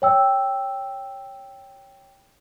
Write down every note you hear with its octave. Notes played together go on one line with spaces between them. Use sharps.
C#5 G5 E6